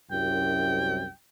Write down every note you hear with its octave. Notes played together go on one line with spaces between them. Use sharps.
C2 F#2 G5